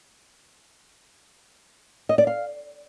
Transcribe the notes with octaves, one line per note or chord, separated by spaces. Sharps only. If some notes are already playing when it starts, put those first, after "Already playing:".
D#5
D5
F5